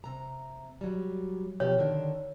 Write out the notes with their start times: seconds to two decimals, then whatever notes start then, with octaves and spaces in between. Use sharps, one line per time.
0.04 C3 A#5
0.81 F#3 G3
1.60 B2 F3 G4 C#5
1.78 D3 D#3 D4